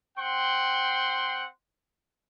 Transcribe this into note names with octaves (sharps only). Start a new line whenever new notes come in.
C4 F#5 G5 C6